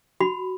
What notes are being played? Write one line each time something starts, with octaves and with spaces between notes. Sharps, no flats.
F#4 B5